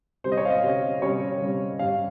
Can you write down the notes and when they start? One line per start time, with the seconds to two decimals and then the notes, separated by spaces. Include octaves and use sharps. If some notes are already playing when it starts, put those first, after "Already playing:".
0.24 C3 G3 C#4 C5
0.32 D#5
0.37 C#5
0.45 F5
0.50 D#5
0.62 C3 G3 C#4
1.02 C3 G3 C#4 C#5
1.41 C3 G3 C#4
1.79 G2 G3 C#4 F5